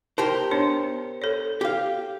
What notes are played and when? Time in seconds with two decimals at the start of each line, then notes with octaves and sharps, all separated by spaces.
0.18 G4 A#4 C5 A5
0.51 B3 D4 C#5
1.22 A4 C#5
1.61 G4 F5